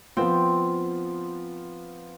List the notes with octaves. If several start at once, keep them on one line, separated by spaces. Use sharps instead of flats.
F3 B3 C4 F4